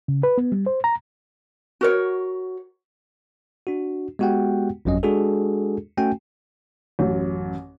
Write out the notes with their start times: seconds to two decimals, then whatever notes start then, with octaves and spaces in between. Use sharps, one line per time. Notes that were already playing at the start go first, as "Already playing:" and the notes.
0.08 C#3
0.23 B4
0.38 B3
0.52 G3
0.66 C5
0.84 A#5
1.81 F#4 A#4 C#5
3.67 D4 F#4
4.19 G#3 B3 F#4 G4 F#5 G5
4.85 G1 F2 F#3 C#4 D#5
5.03 G#3 D4 F#4 G#4 A4
5.98 A3 C#4 F#4 G5 G#5
6.99 A1 F#2